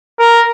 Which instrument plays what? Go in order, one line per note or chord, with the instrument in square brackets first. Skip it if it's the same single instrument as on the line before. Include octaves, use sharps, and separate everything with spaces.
[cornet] A#4